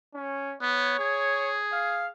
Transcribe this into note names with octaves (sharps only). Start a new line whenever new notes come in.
C#4
B3 C#5
G#4
F5